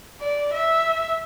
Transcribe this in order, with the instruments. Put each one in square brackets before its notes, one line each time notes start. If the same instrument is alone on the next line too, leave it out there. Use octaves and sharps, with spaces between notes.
[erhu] D5
E5